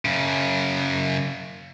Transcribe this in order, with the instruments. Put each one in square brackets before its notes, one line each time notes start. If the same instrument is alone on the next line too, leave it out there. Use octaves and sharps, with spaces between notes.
[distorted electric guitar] F#2 C#3